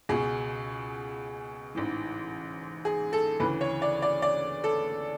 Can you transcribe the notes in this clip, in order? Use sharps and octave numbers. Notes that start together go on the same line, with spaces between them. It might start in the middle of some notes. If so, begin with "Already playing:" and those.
C#2 B2 G#4
A1 G#2 E3
G#4
A4
D2 C#3 E3 B4
C#5
D5
D5
D5
A4